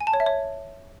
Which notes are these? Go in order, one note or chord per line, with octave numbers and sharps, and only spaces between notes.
G#5
A5
C#5
E5
C#5